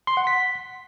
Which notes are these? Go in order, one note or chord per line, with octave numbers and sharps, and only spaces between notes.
C6
F#5
B6